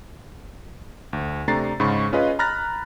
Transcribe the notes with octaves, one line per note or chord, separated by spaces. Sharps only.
D2
C3 A3 D4 A#5 A6 C7
G#2 C#3 B5 C#6
C#4 F4 G#4 B4 D#5
A#5 B5 F6 F#6 A6 A#6